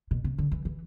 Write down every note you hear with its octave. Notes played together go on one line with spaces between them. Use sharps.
B2
C3
D3
E3
E3